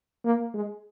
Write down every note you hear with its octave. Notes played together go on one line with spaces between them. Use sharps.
A#3
G#3